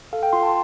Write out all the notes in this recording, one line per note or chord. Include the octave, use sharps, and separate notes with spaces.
A4 F5
G5
F4 C6
A5